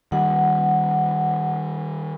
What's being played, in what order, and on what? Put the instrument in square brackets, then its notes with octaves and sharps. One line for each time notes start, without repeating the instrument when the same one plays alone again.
[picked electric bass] D#3 G3 [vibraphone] F#5